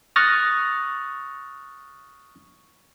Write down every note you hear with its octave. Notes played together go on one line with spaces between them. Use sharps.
C#6 D#6 F6 F#6 A6 A#6